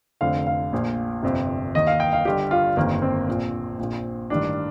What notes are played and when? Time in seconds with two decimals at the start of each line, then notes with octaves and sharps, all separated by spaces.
0.21 F1 F2 D3 F5
0.47 F5
0.73 A#1 A#2
1.23 G1 F2 C3
1.75 D#2 D#3 D#5
1.87 F5
2.00 G5
2.13 F5
2.25 G1 G2 D3 G4
2.51 F4
2.77 G1 F2 D#3 A#3
3.02 C4
3.28 A#1 A#2
3.79 A#1 A#2
4.30 A1 G2 D#3 D4